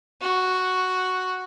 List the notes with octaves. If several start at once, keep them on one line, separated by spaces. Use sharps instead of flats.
F#4